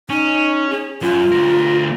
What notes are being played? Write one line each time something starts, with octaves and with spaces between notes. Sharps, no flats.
C#4 D#4
G#4
F#2 F4
D2 A#4